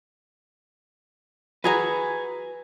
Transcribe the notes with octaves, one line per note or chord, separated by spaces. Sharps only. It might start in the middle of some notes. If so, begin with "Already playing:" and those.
F#4 G#4 B4 G#5 A#5